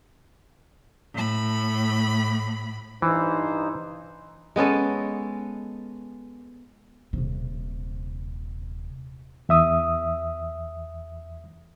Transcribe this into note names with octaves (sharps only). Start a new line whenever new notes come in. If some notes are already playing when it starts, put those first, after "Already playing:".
A2 B5
G2 E3 D#4 C5
G#3 B3 C#4 A4
D#1 C3
E2 E5 D#6